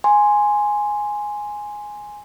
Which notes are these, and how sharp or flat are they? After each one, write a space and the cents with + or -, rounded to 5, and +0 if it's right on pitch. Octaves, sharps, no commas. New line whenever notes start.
G#5 +0 C6 +0